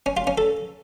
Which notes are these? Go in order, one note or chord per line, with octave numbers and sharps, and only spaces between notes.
C#4
F4
C#4
A4